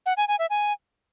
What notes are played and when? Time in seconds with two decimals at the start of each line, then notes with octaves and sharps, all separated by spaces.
0.06 F#5
0.17 G#5
0.28 G#5
0.39 E5
0.50 G#5